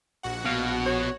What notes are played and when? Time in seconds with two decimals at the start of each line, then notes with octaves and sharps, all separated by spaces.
0.23 A#1 F#4 F#5
0.45 B2 F5
0.86 C#5